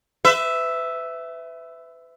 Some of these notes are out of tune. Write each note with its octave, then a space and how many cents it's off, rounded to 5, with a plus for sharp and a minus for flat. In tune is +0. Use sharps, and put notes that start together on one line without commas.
B4 +35 E5 +0